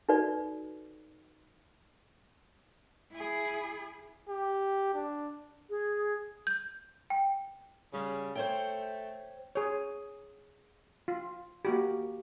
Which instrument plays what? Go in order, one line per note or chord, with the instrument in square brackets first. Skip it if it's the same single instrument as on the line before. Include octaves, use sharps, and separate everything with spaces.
[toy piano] D#4 F#4 A4 B4 D5
[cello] E4 G#4
[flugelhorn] G4
D4
[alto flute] G#4
[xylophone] G6
G5
[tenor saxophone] C#3 [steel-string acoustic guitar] G3
[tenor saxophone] A3 [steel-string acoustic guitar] C5 C#5 G5
[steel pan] G#4 C#5
F4
A#3 F#4 G4